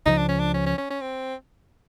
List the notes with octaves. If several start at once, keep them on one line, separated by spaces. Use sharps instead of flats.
C#2 C#3 F3 D#4
D4
C#4
D4
C#4
C#4
C#4
C#4
C4